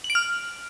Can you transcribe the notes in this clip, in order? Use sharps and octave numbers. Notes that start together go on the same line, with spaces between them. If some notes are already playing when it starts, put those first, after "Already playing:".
F#7
D7
F6